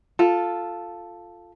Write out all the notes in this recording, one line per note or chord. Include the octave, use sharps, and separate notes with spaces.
F4 A4